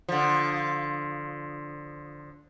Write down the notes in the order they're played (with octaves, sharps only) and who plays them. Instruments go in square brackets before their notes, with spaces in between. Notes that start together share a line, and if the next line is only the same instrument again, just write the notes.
[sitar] D3 F3